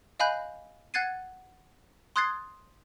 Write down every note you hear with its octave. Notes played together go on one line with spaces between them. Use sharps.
D#5 F5 G#5 B5 F#6 G6
F#5 F#6 G#6 A6 C7 D#7
C6 D#6 F#6 G#6 A6 C7